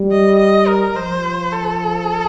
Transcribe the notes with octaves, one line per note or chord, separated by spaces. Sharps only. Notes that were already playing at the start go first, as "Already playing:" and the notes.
Already playing: G3
D#5
D#5
A#4
F3 C5
A4